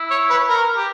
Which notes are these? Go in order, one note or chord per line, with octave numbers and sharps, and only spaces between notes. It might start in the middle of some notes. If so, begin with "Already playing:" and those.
Already playing: E4
C#5
B4
A#4
G4